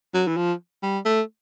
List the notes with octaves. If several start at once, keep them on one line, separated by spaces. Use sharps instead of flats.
F#3
E3
F3
G3
A3